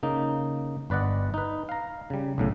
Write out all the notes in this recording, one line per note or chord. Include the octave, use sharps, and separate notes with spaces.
C#3 A#3 D#4
G1 B4 D5 D#5 F#5
D#4 B4
F5 A#5
C#3 G3
B1 A2 C#3